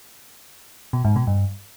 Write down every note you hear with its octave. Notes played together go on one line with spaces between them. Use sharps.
B2
G#2
B2
G2